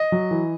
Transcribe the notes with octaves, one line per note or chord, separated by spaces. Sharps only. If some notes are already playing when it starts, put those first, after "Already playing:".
Already playing: D#5
F#3
E3